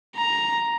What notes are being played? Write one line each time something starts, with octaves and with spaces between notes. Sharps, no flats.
A#5